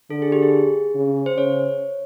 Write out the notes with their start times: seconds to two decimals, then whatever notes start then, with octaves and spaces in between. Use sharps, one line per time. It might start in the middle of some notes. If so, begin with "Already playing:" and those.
0.10 D3 A4
0.22 G#4
0.32 G4
0.42 G#4
0.95 C#3
1.26 C5
1.37 C#3 C#5